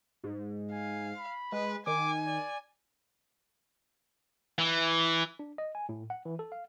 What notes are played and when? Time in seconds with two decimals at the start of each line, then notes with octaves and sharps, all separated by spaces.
0.24 G#2
0.72 F5 G#5
1.17 B5
1.52 G#3 B4
1.87 D#3 G#5 D6
2.26 D5
4.58 E3
5.39 D4
5.58 D#5
5.75 G#5
5.89 A2
6.10 F#5
6.25 E3
6.39 A4
6.52 F5